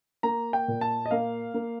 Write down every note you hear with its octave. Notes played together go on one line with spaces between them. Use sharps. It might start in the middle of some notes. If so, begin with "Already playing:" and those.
A#3 A#5
G5
A#2
A5
D#5
A#3 F5
A#3